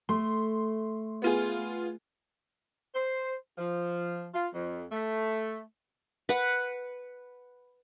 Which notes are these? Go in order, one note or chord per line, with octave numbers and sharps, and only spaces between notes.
A3 C6
B3 F4 G#4
C5
F3
F4
F2
A3
B4 F#5